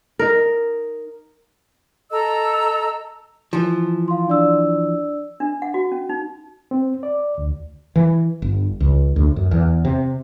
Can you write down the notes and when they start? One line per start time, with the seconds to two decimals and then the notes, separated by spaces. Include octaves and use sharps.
0.19 D#4 A#4
2.11 A4 D#5 A#5 E6
3.53 E3 F3
4.08 F5 C6
4.28 D4 D5 E6
5.40 D4
5.62 F#5
5.74 F#4
5.92 C#4
6.09 D#4
6.71 C4
7.03 D5
7.38 D2
7.96 E3
8.42 G1
8.80 C#2
9.16 D2
9.36 F#2
9.51 E2
9.85 C3